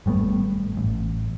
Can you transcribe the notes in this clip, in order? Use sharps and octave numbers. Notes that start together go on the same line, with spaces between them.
G#1 G3 A3 B3
A1